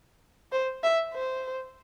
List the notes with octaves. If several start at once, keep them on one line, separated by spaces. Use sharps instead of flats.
C5
E5
C5